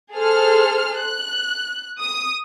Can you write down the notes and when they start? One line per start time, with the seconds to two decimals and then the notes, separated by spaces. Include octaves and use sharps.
0.14 G#4 A4 C5 F6
0.99 F#6
2.00 D#6